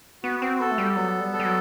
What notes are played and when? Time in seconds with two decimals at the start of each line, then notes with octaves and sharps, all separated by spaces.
0.23 B3 F#4
0.42 C4
0.60 B3 A4
0.71 A3
0.78 G3
0.96 F#3 B3
1.20 G3
1.33 A4
1.40 G3
1.45 F#3